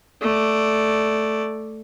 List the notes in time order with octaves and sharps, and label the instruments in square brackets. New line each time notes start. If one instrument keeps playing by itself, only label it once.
[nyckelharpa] A3 D5